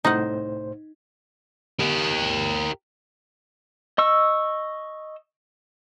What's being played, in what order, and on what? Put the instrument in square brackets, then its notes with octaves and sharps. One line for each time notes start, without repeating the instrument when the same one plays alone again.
[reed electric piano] C2 A2 C5 [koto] D#4 F#5
[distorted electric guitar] G4 A#4
[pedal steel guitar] D#5 C#6 E6